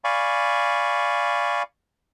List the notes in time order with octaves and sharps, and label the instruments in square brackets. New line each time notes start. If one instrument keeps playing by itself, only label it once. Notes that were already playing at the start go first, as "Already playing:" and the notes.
[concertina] D5 F5 G#5 B5 C#6